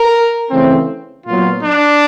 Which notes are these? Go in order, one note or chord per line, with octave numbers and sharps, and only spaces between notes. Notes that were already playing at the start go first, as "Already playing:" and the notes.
Already playing: A#4
C#3 E3 A3 C4
A#2 F#3 B3 F4
D4